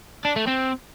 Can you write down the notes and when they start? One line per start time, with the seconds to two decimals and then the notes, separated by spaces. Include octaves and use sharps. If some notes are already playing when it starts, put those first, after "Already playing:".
0.25 D4
0.36 A3
0.47 C4